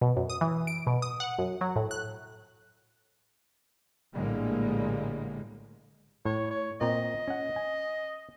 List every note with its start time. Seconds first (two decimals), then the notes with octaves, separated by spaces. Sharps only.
0.01 B2
0.17 F#2
0.30 D#6
0.41 E3
0.67 D7
0.87 B2
1.02 D#6
1.20 F#5
1.38 F#2
1.61 F#3
1.76 A2
1.91 F#6
4.13 A#1 A2 D3 G3 G#3 A#3
6.25 A2 C#5
6.51 C#5
6.81 A#2 C4 D#5 A#5
7.28 C#4 F#5
7.56 G#5